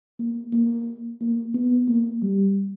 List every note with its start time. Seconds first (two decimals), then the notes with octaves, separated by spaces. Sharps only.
0.19 A#3
0.53 A#3
1.21 A#3
1.54 B3
1.89 A#3
2.22 G3